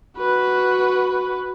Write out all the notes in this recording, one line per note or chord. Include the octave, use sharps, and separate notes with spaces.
F#4 B4